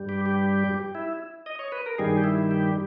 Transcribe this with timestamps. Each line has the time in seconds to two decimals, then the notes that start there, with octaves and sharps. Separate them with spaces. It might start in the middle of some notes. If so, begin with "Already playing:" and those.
Already playing: G2 G3
0.09 G4
0.26 G4
0.95 E4
1.46 D#5
1.59 C#5
1.72 B4
1.86 A#4
1.98 G2 D#3 G3 G#4
2.17 G4
2.24 E4
2.51 G4